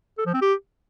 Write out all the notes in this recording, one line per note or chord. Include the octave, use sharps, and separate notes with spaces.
A4
F3
C4
G4